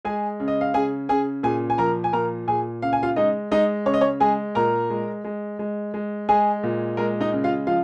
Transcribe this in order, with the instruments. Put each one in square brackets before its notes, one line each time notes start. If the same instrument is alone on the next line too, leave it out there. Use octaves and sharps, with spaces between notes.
[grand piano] G#3 G#4 G#5
C#3
D#5
F5
C#3 G#4 G#5
C#3 G#4 G#5
A#2 G#4 G#5
G#5
F3 A#4 A#5
G#5
A#2 A#4 A#5
A#2 G#4 G#5
C#3 F5
G#5
F4 F5
G#3 D#4 D#5
G#3 D#4 D#5
C#3 C#5
D#5
C#4 C#5
G#3 G#4 G#5
A#2 A#4 A#5
G#3
G#3
G#3
G#3
G#3 G#4 G#5
A#2
G#3 A#4
D#4 D#5
C#3
F4 F5
F3 F4 F5